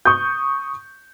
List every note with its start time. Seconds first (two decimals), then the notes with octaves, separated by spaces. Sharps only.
0.05 C#6 D#6 G6